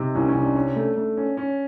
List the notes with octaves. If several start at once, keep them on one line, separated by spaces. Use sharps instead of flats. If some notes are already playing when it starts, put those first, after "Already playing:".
Already playing: C3 D#4
C2 C#4
C#4
C3
D4
C#4 D4
A3
A3
C#4
C#4